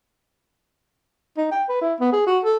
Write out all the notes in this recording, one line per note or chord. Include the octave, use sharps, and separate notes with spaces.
D#4
G5
B4
E4
B3
G#4
F#4
A4